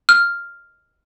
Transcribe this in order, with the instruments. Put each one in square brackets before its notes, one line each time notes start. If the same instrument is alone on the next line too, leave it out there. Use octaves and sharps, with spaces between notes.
[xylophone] F6